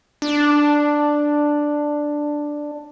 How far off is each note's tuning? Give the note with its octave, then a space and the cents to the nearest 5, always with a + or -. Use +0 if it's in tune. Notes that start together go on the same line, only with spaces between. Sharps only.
D4 +5